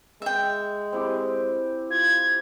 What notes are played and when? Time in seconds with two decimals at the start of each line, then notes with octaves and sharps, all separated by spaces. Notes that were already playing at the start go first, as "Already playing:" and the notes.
0.22 G#3 E5 G5
0.92 C4 E4 G4
1.90 F4 G#6